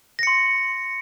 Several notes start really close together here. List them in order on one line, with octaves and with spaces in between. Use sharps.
A#6 C#7 C6